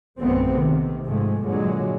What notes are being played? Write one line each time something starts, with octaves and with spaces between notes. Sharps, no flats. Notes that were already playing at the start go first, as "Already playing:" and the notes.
A#1 F#2 D3 A3 B3 C4
C3 D#3
G#2 C3 F3 G#3 A3
G2 A#2 D3 F#3 G#3